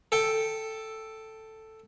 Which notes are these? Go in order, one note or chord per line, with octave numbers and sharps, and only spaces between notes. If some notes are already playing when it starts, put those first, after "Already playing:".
A4 G5